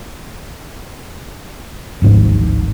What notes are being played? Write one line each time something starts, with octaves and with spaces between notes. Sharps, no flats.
D1 G#1 G#2 F3